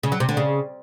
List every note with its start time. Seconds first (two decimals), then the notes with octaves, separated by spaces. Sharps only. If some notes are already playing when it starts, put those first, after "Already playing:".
0.03 C#3
0.12 F#3
0.20 C3
0.29 D3
0.37 C#3